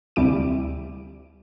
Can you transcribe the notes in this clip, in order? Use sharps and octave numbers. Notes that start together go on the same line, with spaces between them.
D2 C3 G3 E4 D6 D7